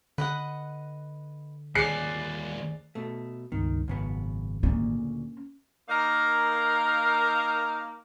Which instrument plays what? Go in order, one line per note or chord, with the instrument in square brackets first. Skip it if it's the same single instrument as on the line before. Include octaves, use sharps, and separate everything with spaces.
[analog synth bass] D3 [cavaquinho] B4 D#5 F#5
[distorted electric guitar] D#2 C#4 [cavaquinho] G#4 D5 [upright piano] F#6 C7 C#7
[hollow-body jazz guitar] B2 A3
[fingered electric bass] C#2 G2 B3 [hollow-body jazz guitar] D#3
[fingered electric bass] G#1 [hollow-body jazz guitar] F#2 C#3 B3
[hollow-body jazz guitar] D2 A#2 C#3 [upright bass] A#3 C#4
[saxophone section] A#3 D#4 A#4 F5